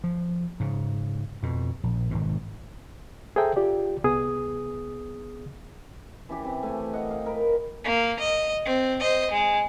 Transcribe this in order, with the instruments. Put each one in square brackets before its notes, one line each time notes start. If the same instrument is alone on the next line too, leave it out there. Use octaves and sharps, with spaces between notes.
[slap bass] F3
G#2 C#3
F2 B2
A#1
G#1 G#2 B2
[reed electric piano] G#4 A4 C5 E5 G5 A#5
F4 G4 D5
C2 B3 G#4 D#6
[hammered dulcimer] E3 C#4 G4
C3
A3 G#5
D#5 F#5
F5 G5
A#4 B4
[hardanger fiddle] A#3
D#5
C4
C5 D#5
G#3